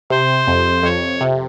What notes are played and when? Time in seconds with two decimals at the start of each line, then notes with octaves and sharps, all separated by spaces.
0.10 C3 C5
0.47 F2
0.83 F2 C#5
1.21 C3